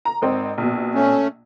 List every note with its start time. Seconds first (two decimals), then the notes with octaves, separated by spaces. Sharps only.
0.05 A#5
0.22 G#1 C4 D#5
0.58 A#1 B2
0.95 A3 C#4